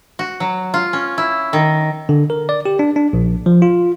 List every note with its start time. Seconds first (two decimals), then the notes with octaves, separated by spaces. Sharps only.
0.19 F#4
0.40 F#3
0.74 F4
0.93 C#4
1.18 E4
1.53 D#3
2.09 D3
2.30 A#4
2.49 D5
2.66 G4
2.79 D4
2.96 D4
3.13 A#1
3.46 F3
3.62 F4